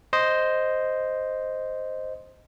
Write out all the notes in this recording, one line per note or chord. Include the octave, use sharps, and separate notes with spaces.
C5 D#5